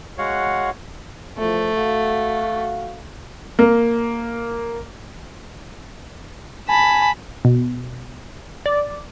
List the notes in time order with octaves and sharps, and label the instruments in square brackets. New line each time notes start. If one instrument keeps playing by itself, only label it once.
[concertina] G#3 F#4 C#5 F5 F#5
[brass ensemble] E2 F3 [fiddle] A3
[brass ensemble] F#4 F5
[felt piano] A#3
[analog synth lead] G#5 [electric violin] A5 B5
[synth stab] B2
D5